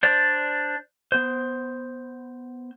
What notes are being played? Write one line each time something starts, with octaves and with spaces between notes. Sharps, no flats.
D4 C5 D5
B3 C5